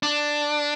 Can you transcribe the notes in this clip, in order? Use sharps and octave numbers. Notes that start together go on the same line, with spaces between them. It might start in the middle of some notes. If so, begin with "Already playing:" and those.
D4